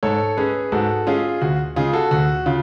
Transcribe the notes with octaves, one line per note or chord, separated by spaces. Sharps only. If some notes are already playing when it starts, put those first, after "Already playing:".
G#2 A4 C#5
G#3 C#4 G#4 B4
G#2 F#4 A4
G#3 C#4 F4 G#4
D2 F#4
C#3 G#3 F4 G#4
F#4 A4
D2 F#4
C#3 F4